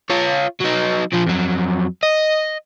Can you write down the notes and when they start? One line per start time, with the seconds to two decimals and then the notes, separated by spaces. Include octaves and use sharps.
0.10 F4 C#5
0.61 F#3 D#4
1.13 A#2 F3
1.26 F2 F#3
2.03 D#5